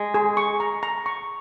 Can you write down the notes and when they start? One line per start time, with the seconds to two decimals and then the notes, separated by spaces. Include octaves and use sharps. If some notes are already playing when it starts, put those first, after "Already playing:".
Already playing: G#3
0.14 G#4
0.37 C#6
0.60 A#5
0.83 A#5
1.06 C#6